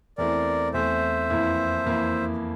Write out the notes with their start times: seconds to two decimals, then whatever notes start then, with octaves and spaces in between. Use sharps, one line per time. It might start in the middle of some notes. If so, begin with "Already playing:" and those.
0.18 E2 E3 A3 C4 A#4 D5
0.74 E2 E3 A3 C4 C5 E5
1.30 F2 E3 A#3 E4
1.86 F2 E3 A#3 E4